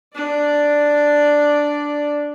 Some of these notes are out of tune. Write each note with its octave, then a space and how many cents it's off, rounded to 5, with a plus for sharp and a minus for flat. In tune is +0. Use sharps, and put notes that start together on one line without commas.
D4 +0 D5 +0